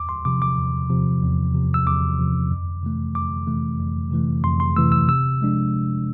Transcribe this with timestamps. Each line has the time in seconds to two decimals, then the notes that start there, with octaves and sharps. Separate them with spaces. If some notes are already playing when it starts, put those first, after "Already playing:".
Already playing: E2 D6
0.09 C6
0.25 C3 F3 D6
0.42 D6
0.58 E2
0.90 C3 F3
1.22 E2
1.54 C3 F3
1.74 E6
1.87 E2 D6
2.19 C3 F3
2.51 F2
2.83 C3 E3 A3
3.15 F2 D6
3.47 C3 E3 A3
3.79 F2
4.11 C3 E3 A3
4.44 F2 C6
4.60 C6
4.76 C3 E3 A3 E6
4.92 E6
5.08 C3 E6
5.41 F3 G#3 D4
5.73 C3